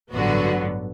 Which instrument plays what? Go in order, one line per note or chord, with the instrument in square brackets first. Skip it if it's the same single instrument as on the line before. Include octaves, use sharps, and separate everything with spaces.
[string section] A1 G2 D3 F#3 B3 F#4